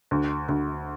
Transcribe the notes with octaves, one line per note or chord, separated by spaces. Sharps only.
D2
D2